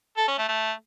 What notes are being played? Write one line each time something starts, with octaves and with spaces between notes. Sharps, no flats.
A4
C#4
A3
A3